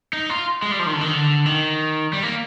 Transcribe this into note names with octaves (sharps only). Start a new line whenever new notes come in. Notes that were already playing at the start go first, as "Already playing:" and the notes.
D#4
F4
G#3
G3
F3
D#3
D3
D#3
D3
D#3
G3
A#3